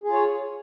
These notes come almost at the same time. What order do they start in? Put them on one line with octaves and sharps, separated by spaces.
G#4 F4 C#5